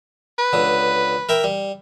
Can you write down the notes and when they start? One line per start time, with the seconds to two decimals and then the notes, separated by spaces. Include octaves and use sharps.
0.39 B4
0.53 C#2 D3
1.29 A#4 E5 G5
1.44 G3